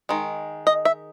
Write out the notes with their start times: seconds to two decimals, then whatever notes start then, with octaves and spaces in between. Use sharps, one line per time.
0.09 D#3 G#3
0.67 D#5
0.85 E5